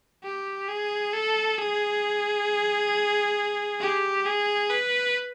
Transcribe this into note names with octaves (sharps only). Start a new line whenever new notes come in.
G4
G#4
A4
G#4
G4
G#4
B4